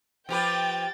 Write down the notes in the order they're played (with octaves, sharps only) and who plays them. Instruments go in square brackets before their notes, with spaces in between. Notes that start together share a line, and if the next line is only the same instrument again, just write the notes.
[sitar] F3 G4 B4 [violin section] G5 A6